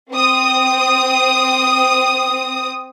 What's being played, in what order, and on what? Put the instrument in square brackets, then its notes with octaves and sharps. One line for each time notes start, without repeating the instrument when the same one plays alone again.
[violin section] C4 D#6